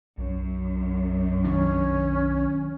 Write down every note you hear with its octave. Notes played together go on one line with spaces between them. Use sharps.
B1 F#2
D#3 F#3 C#4 D4